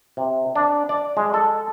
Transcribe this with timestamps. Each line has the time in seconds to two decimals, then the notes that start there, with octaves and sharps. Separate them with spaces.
0.17 C3
0.56 D4
0.89 D5
1.17 G#3
1.34 A4